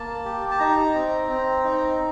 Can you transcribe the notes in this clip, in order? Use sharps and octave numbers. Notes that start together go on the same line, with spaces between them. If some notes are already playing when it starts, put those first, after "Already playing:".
Already playing: A#3 A5
G4
A5
D#4 A#5
C4
C4
D#4